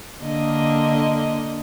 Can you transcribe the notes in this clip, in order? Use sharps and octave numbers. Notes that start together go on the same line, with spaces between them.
D3 A#3 D#5